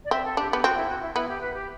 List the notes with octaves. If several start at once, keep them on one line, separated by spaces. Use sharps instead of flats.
D5
C4 E5
A4
D4 G4
B3 G4
C4 F#4
E4
F#4
E4
B3 E4
G4
B4
G4